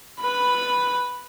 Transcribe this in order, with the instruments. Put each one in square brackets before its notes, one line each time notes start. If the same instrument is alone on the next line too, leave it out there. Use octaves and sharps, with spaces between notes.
[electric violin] B4 B5